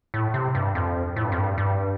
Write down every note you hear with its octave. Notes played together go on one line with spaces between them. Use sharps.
A2
C3
G2
F2
A2
G2
F2
G2
G2